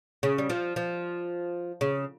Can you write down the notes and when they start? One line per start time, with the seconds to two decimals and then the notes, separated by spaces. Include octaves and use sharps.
0.23 C#3
0.38 G3
0.50 F3
0.76 F3
1.81 C#3